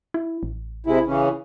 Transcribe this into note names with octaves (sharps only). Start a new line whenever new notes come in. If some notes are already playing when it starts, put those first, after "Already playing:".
E4
A1
C3 G#3 E4
C#3 E3 C#4